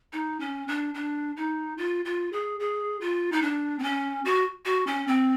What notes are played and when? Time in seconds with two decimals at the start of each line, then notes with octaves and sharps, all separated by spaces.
0.13 D#4
0.40 C#4
0.68 D4
0.94 D4
1.37 D#4
1.78 F4
2.05 F4
2.33 G#4
2.60 G#4
3.01 F4
3.32 D#4
3.42 D4
3.79 C4
3.83 C#4
4.25 F#4
4.65 F#4
4.87 C#4
5.07 C4